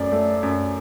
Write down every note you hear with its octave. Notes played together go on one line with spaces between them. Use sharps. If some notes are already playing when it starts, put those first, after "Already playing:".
Already playing: F#2 A3 D5
A3
F#2